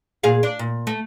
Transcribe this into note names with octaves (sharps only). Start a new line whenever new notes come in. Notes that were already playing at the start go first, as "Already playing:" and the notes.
A#2 G#4 F5
D4
A#2
A3